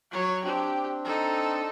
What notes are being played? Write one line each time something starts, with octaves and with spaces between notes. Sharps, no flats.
F#3 C#5
C4 D4 G4
D#4 A4